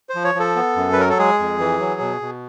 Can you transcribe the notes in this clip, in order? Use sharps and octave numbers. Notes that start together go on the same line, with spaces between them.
C5
F3
C#5
F3 A4
B3
F#2
B4
F#3 A#4
A4
G#3 G#4
F2
E3
F#3
B2
B2